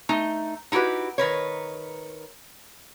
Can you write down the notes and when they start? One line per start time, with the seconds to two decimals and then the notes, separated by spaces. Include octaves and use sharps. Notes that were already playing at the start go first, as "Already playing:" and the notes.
0.09 A3 D#4
0.72 D#4 E4 F#4 G4 B4
1.18 D#3 A#4 B4 C#5